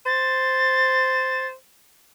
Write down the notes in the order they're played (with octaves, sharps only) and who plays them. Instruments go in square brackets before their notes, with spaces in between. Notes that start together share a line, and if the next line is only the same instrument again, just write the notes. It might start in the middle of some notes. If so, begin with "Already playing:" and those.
[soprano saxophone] C5 [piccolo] A6